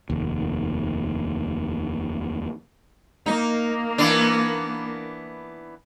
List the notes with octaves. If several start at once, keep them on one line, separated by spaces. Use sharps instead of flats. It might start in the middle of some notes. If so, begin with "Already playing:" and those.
F1 D#2
A#3 D#4
E3 B3 D4